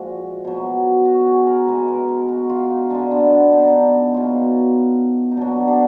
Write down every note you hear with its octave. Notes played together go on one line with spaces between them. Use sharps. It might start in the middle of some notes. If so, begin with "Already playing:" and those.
Already playing: A#2 F3 G#3 F#4
B2 F#3
F#4
F#4
G#4
A#4
B2 G#3 B4
A#4
A#4
F#4
F4
D#4
D3 G#3 D4
B3
B3
D4
D#4
D4
D#4
B2 F#3 F4
D#4
B2 F#3 D4
D4